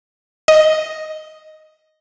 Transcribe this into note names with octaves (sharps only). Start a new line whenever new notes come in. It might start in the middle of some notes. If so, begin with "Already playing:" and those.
D#5